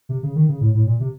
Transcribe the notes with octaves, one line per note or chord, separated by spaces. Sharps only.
C3
C#3
D#3
C#3
A2
A2
A#2
C3